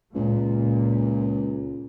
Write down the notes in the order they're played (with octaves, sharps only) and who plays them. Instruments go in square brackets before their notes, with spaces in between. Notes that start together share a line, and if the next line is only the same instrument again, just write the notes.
[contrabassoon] C#2 [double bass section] A#2